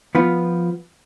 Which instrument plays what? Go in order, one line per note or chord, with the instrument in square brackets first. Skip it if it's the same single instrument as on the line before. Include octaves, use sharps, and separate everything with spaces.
[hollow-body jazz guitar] F3 B3 F4